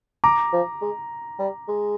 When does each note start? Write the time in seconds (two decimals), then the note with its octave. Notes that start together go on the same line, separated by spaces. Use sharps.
0.24 A#5 D6
0.53 F3
0.81 G#3
1.39 G3
1.68 G#3